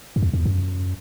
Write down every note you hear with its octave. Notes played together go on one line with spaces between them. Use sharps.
F#2
E2
E2
F#2